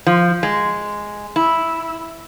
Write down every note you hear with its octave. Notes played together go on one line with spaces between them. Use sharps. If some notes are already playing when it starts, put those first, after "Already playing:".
F3
G#3
E4